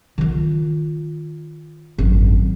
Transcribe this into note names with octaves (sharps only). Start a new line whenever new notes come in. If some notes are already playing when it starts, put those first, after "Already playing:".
D#3 F4
G#1 F#2